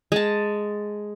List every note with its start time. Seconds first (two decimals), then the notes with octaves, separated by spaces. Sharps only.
0.12 G#3 A5